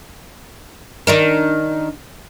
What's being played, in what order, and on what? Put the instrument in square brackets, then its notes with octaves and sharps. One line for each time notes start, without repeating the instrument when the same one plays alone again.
[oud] D#3 D4 A#4